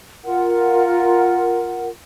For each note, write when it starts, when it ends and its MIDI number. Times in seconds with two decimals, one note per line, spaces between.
0.24 1.88 65
0.24 1.88 70
0.24 1.88 78